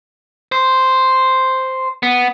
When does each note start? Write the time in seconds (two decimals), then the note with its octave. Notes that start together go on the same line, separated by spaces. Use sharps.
0.52 C5
2.03 B3